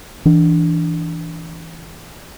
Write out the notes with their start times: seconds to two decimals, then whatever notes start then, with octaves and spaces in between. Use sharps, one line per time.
0.25 E3 D4